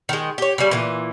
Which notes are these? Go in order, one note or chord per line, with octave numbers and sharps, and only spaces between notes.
D#3 G#3
G4 C#5
C#3 G3
A#2 E3